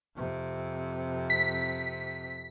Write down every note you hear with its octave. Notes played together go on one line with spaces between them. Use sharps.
F2 C3
B6